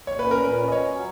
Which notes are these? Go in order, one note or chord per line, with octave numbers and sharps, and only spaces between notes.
A#2 C#5
C#4 B4
A#4
A#2 B4
C#4
D#5
C#4 C#5
F#3